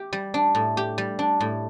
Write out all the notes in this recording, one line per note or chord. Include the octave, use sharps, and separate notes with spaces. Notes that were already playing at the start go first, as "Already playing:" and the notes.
Already playing: G4
G3
D4
A2
G4
G3
D4
A2